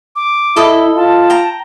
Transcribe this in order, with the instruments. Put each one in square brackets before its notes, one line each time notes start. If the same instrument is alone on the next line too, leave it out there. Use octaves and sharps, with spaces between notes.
[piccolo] D6
[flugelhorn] E4 [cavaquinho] A4 D#5
[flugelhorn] F4 [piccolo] A5
[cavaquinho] G5 A#5